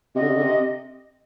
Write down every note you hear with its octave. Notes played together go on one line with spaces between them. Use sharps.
C3 D#5
D3
C3
D3
C3